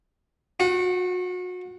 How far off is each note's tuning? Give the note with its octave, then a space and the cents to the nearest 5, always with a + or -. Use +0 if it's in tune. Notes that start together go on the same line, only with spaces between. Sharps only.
F#4 -35 F#5 +30